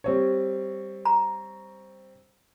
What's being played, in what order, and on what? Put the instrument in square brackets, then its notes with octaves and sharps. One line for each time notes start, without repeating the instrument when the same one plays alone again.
[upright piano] G3 C4 C#5
[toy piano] A#5